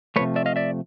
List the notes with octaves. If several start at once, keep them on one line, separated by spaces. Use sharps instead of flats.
C3 F3 A3 B4 C#5
D5 E5
D#5 F5
D5 E5